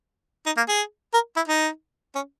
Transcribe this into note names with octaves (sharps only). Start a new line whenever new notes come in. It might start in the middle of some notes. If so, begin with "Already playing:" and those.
D#4
A#3
G#4
A#4
E4
D#4
C#4